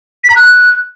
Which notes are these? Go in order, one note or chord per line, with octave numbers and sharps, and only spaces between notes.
B6
A#5
F#6